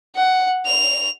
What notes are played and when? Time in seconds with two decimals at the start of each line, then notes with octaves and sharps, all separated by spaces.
0.15 F#5
0.65 F7